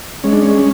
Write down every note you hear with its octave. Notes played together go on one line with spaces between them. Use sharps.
G#3 C#4
D4
C#4